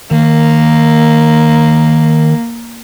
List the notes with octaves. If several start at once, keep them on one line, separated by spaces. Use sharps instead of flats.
D#3 A#3